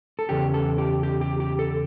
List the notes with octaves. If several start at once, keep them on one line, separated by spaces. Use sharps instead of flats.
A4
E2 C#3 G4
A4
G4
G4
G4
G4
A4